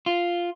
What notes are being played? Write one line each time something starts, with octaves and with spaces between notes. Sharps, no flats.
F4